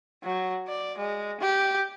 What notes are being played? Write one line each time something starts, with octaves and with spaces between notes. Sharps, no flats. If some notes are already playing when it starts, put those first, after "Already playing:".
F#3
D5
G#3
G4